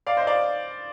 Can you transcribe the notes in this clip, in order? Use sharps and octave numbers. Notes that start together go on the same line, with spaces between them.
D5 F5
C5 D#5
D5 F5